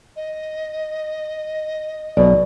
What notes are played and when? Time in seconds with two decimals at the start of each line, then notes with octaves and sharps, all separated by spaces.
0.16 D#5
2.17 B1 B2 D5